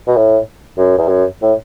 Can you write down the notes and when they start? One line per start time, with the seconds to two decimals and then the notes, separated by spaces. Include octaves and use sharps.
0.08 B2
0.17 A2
0.77 F#2
0.98 E2
1.08 F#2
1.42 A2